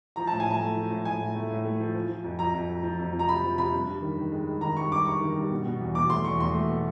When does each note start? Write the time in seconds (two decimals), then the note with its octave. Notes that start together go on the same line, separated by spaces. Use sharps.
0.16 F3 A#5
0.27 A2 A5
0.40 G#5
0.46 A2 A5
0.60 A3
0.76 F3
0.90 A2
1.05 A2 G#5
1.21 A2
1.35 A3
1.51 A2
1.65 A3
1.80 F3
1.95 F3
2.09 F3
2.24 F2
2.39 F2 A#5
2.54 F2
2.69 F2
2.83 F3
2.99 F2
3.13 F2
3.19 A#5
3.28 C3 B5
3.43 F3
3.58 C3 B5
3.73 G2
3.87 G2
4.02 D#3
4.18 D#3
4.32 G#3
4.46 G#3
4.61 D#3 A#5
4.77 G2 C#6
4.91 G2 D6
5.06 G2 C#6
5.21 D#3
5.36 G2
5.50 B2
5.65 B2
5.81 E2
5.95 B2 D6
6.10 A3 C6
6.24 E2 C#6
6.39 E2 C6
6.54 A3
6.69 B2